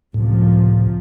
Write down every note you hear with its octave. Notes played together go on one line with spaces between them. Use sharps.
C#2 A2 C3 F3